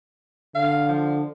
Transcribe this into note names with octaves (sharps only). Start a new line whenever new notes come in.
D3 F5
F3